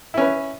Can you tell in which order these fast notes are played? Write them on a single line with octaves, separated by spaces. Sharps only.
E4 C#4 B4